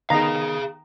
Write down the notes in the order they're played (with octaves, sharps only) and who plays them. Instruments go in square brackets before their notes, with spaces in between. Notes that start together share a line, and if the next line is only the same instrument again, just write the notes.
[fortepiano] D#3 B3 D#4 [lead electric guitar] G#4 F5 [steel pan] A#5